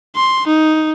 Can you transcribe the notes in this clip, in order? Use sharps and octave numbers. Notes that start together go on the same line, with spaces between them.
C6
D#4